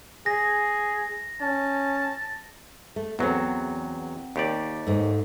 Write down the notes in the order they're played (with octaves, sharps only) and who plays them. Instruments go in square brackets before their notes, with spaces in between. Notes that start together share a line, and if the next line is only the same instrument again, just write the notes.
[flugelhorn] G#4 [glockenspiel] A#6
[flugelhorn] C#4 [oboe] A5
[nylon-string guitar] A3
[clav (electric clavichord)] E2 F#3 [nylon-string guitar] B3 C4
[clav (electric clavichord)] D#2 G4 D5
[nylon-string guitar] G#2 A3